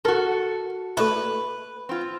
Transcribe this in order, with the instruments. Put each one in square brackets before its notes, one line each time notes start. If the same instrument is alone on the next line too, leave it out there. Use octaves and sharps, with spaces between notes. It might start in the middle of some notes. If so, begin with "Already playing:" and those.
[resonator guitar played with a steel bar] F#4 A4 [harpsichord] A#4
[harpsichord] A3 D4 E4 [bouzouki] B4
[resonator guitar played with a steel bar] C4 F4